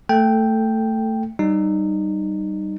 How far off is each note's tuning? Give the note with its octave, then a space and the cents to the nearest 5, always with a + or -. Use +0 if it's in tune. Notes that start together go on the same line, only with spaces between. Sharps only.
A3 +20 A4 +0 G5 +0
G3 -15 D#4 -20